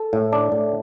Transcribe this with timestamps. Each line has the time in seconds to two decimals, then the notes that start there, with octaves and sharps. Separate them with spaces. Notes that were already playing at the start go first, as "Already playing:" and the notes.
Already playing: A4
0.13 A2
0.33 D4
0.52 A2